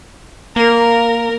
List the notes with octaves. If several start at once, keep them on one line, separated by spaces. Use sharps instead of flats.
A#3 A#4